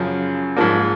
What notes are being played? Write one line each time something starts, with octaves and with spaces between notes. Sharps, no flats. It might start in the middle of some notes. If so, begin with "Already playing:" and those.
Already playing: F#2 C#3 F3 G#4
G#2 F3 A#3